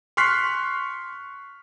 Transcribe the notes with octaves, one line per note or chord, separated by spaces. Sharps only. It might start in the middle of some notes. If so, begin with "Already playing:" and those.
C6 C#6 F6 F#6 B6 C7